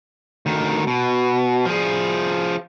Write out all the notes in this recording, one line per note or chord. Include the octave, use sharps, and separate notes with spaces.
D2 D#3
B2
F3 G#4